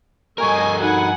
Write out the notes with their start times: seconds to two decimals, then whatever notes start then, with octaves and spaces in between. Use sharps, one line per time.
0.38 G2 A4 A#4 D#5 G#5 C#6
0.80 D#4 F#4 F#5 G#5 B5